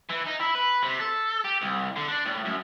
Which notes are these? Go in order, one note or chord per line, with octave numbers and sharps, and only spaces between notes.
E3
D#4
E4
B4
C3
A4
G4
C2
D3
D4
A2
F#2